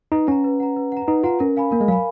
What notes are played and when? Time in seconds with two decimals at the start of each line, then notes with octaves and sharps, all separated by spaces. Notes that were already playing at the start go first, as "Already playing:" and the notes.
0.12 D#4 B4
0.27 C#4 F#5 A#5
0.44 B4
0.60 F#5 A#5
0.76 B4
0.92 F#5 A#5
1.07 D#4 B4
1.24 F4 F#5 A#5
1.40 C#4 A#4
1.57 F5 G#5 B5
1.72 A#3 A#4
1.81 G#3
1.88 F#3 F5
1.91 G#5 B5